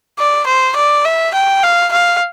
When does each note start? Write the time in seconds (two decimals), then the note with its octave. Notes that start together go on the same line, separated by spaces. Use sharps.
0.19 D5
0.47 C5
0.77 D5
1.05 E5
1.34 G5
1.63 F5
1.92 F5